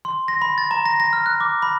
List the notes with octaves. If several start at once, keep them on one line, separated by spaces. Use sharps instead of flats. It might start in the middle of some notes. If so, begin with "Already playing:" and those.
C6
A#6
B5
A6
A#5
A#6
A#6
F6
F#6
D6
B5